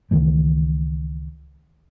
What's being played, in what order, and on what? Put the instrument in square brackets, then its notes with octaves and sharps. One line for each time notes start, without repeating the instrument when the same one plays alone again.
[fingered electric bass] C#2 D#3 E3 A3